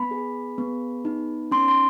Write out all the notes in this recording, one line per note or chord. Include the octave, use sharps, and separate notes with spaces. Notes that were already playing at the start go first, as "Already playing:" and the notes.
Already playing: B3 B5
G#4
B3
D#4
C#4 C6
C6